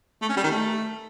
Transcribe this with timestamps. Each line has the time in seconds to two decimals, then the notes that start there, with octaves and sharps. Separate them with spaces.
0.21 A3
0.29 C#4
0.36 G3
0.44 D#3
0.51 A3